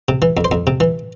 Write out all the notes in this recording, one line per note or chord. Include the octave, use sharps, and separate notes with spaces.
C3
E3
F2
C5
F2
C3
E3